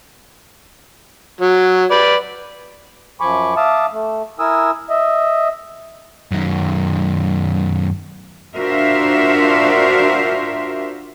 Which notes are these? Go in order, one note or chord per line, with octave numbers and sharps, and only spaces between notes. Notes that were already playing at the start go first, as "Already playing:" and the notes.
F#3
B4 D5
F#2 F3 G#5 B5 C#6 D6
E5 F5 A5 D6 D#6
A3
E4 A#4 G#5 D#6 E6
D#5 E5
F#2 D#3
D4 F4 F#4 A#4 C5 E5